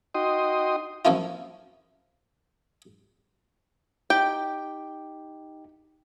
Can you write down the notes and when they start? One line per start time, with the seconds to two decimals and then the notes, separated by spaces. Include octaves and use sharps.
0.15 D#4 F#4 D#5 G5 C6 D#6
1.05 F3 F#3 A#3 C#4 E4 F4
4.10 D#4 G4 G5